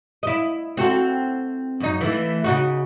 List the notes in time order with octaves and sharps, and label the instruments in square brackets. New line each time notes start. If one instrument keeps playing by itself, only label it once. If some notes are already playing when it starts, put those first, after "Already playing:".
[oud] E4 D#5
C4 F#4 A4
F#2 D#4
E3 A3
C#3 D#4 F#4